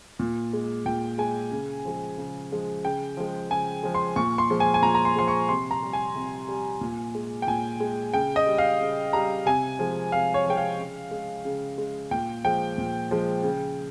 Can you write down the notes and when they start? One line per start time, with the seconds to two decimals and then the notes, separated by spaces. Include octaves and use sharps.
0.19 A#2
0.53 G#3
0.86 A#2 G5
1.18 G#3 G#5
1.51 C#3
1.85 F3 G#3
2.18 C#3
2.52 F3 G#3
2.85 C#3 G5
3.17 F3 G#3
3.50 C#3 G#5
3.83 F3 G#3
3.95 C6
4.16 A#2 C#6
4.38 C6
4.50 F3 G#3
4.60 G#5
4.74 G#5
4.82 A#2 A#5
4.95 A#5
5.05 C6
5.16 F3 G#3 C6
5.28 C#6
5.49 C3 C6
5.71 A#5
5.83 G3
5.93 G#5
6.16 C3
6.49 G3
6.81 A#2
7.15 G#3
7.42 G5
7.47 A#2 G#5
7.80 G#3
8.14 C#3 G5
8.36 D#5
8.47 G3
8.58 F5
8.81 C#3
9.13 G3 A#5
9.46 C3 G#5
9.79 F3 G#3
10.12 C3 F5
10.34 C#5
10.46 F3 G#3 G5
10.57 F5
10.79 C#3
11.11 G#3
11.45 C#3
11.78 G#3
12.11 A#2 G5
12.45 F3 G#3 G5
12.78 A#2
13.11 F3 G#3
13.43 C#3